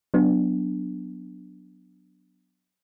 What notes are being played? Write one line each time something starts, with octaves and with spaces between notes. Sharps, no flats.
F#3 B3 D4